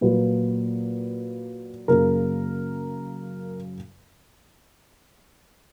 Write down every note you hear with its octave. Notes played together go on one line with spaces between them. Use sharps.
A#2 F#3 A#3 B4
F#2 C#3 F#3 A#3 A#4